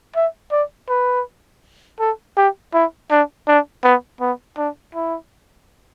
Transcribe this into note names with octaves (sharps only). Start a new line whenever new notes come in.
E5
D5
B4
A4
G4
E4
D4
D4
B3
B3
D4
E4